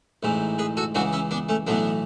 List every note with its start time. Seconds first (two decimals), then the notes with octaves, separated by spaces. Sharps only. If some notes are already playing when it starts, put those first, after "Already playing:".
0.23 A1 G#2 E3
0.59 G#4 B4
0.77 F#4 A4
0.95 C#2 C#3 E3 D4 F#4
1.13 C#4 E4
1.31 B3 D4
1.49 A3 C#4
1.67 B1 A2 E3 B3 D4